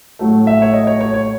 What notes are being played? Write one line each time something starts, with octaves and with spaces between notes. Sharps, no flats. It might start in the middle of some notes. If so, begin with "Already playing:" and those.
A2 F#3 A3
E5
C#5
D#5
C#5
C#5
C#5